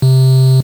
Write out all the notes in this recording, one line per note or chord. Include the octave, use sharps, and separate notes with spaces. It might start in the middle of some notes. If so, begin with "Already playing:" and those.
C3